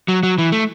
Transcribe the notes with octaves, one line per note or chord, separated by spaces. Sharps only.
F#3
F#3
E3
A3